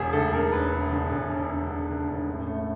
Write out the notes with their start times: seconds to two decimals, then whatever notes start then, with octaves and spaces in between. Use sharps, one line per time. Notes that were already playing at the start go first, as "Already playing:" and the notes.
Already playing: E1 G#4
0.13 D2 A4
0.32 E1 A#4
0.52 E1 B4
0.72 E1
0.92 D3
1.11 E1
1.30 E1
1.49 E1
1.69 E1
1.89 D3
2.08 E1
2.28 A1
2.47 A3